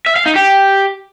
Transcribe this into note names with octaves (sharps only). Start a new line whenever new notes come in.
E5
F5
D#4
G4